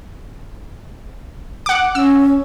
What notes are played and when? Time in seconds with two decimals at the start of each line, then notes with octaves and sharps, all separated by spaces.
1.66 F#5 D6
1.95 C#4 E6